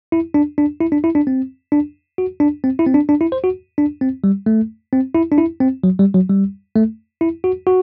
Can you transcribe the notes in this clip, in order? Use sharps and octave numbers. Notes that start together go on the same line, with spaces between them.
E4
D4
D4
E4
D4
E4
D4
C4
D4
F#4
D4
C4
E4
C4
D4
D4
E4
C5
F#4
D4
C4
G3
A3
C4
E4
D4
E4
C4
F#3
G3
F#3
G3
A3
E4
F#4
F#4